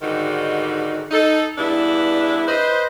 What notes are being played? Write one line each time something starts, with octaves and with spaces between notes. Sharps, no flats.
G#2 D3 D#3 G3 D#4 F#4
D#4 A4
E2 G2 D4 E4
B4 C5 D#5